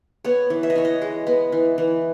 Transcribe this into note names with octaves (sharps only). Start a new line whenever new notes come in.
B3 C#5
E3
E5
D#5
E3 C#5
D#5
G#3
B3
E3
E3